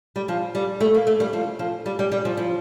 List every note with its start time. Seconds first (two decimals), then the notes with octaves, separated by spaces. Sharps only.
0.16 G3
0.28 F3
0.55 G3
0.80 A3
0.94 A#3
1.07 A3
1.20 G3
1.33 F3
1.59 F3
1.86 G3
1.99 G3
2.12 G3
2.25 F3
2.37 F3